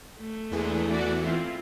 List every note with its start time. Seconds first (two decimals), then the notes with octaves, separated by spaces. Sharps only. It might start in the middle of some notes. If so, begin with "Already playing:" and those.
0.19 A3
0.51 E2 E3 G#3 A#3 D4
0.89 F#4 D5
1.24 C4 E4 F4